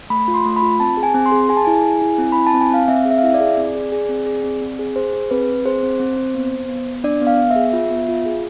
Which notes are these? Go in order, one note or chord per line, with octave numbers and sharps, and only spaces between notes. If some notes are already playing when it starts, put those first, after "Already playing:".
A3 B5
F4
C6
A3
B5
F4
C4 A5
G#4
G#5
C4
C6
G#4
G#4 G#5
A5
E4 G#5
G#4
E4
C4
E4 B5
A5
C4
G#5
C4 F5
C4 E5
G#4
E5
F5
E4 E5
D5
G#4
C4
G#4
G#4
C4
G#4
C4
C4
G#4
G#4 C5
G#4
C4 B4
C4
G#4 C5
C4
C4
C4
B3
B3
B3
B3
D4 D5
B3
F5
B3
E5
G#4
F4
B3
F4
G#4